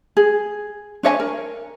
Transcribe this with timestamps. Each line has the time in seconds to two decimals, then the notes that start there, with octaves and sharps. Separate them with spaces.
0.17 G#4
1.03 D4 C#5 D#5 G#5
1.20 A#4